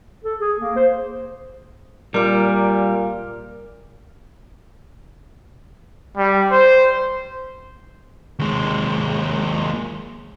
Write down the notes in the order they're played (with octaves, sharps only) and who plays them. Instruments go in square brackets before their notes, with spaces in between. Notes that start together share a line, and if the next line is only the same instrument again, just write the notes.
[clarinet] A4
G#4
A#3
C5
[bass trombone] A#2 [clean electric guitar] G3 [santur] A#4 D6
[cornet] G3
C5
[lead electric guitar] D#2 G#3